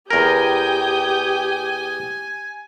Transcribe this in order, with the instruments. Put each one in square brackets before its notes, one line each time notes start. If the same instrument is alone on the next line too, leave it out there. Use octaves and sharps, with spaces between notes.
[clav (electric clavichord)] E2 A#4 [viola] G4 [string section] G5 D#6 G6 [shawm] G#5